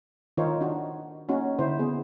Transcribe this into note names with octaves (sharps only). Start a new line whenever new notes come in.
D#3 D#4 F4 A#4 C5 C#5
D4 D#4 F#4
A#3 C#4 D#4 F#4
D3 E4 C5
B3 G#4